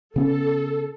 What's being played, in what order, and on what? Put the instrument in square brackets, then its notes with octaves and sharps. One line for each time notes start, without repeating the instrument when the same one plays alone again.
[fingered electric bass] C#3 B3 C#4 [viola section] A4